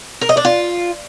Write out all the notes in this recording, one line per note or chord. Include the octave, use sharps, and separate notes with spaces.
A#4
D#5
D4
F4